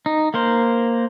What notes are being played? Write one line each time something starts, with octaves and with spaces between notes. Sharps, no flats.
D#4
A#3 A#4 C5